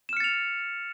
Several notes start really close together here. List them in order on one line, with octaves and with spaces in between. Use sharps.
E7 F6 C#7 A6 F7